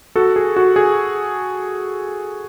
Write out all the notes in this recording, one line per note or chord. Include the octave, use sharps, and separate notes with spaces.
F#4 A4
G#4
F#4
G#4